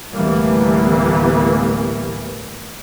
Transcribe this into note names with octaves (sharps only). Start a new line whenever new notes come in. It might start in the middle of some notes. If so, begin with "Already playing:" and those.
D2 A2 E3 G3 A#3 B3